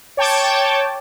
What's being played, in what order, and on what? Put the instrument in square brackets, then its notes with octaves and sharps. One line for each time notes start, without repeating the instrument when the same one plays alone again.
[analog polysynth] C#5 G5 A5 D6